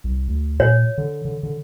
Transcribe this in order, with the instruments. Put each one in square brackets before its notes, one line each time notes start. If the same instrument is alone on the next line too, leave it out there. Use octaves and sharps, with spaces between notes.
[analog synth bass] C2
D2
[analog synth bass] A#2 [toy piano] C#5
[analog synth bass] D3
D3
D3